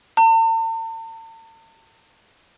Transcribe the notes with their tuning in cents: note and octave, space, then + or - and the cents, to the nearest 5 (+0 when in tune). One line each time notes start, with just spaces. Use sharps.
A5 +45